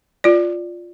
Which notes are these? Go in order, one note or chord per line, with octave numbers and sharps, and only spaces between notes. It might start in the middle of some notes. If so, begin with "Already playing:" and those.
F4 D5